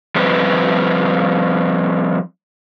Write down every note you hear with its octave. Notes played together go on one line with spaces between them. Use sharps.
F3 G3 C4 D#4 G4 B4